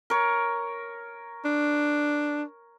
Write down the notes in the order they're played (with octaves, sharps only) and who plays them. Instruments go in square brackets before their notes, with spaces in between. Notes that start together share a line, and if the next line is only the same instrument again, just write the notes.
[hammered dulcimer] A#4 C#5
[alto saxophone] D4